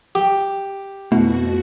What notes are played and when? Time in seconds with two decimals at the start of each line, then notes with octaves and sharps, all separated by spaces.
0.15 G4
1.12 F2 B2 A3 E4 F#4 F#5